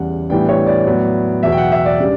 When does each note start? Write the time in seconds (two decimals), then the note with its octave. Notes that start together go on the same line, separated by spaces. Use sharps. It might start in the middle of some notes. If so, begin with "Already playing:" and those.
Already playing: E2 C#3 G3 F#5
0.29 A2 E3 G3 B3 D4 G5
0.49 C#5
0.67 D5
0.86 A2 F#3 B3
1.43 E2 B2 F#3 E5
1.52 G5
1.58 F#5
1.72 E5
1.86 D5
2.00 C#3 G3 D4